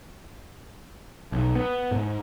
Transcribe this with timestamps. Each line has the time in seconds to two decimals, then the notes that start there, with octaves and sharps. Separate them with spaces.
1.32 B1
1.55 B3
1.91 G#2